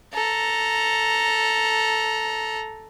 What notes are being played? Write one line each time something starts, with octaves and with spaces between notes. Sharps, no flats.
A4 A#5